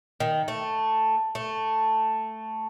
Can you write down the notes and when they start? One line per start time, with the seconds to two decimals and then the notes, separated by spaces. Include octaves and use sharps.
0.20 D#3
0.48 A3
1.35 A3